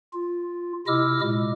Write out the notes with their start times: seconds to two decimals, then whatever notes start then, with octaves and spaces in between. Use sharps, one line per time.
0.13 F4
0.87 C3 E4 D#5 D6 E6 F6
1.21 A#2 G#3